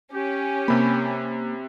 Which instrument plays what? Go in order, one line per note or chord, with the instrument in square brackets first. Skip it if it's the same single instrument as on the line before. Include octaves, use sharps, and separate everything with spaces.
[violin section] C#4 [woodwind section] G4
[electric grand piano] C3 B5 [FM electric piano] A#3